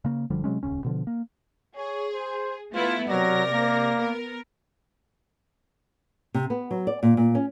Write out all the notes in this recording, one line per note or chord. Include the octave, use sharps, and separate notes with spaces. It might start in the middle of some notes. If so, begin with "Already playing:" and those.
C#3 A#3
F#1 D3 F3 G3
C3 F#3 G#3 C#4
D#1 C#2 C#4
B2 D3 F3
A#3
G#4 C#5
C5
A3 B3 E4 F4
C3 F#3 A#4 D5 A#6
A#3
B3 A#4
C3
B3
F#3
D5
A#2
A#2
C#4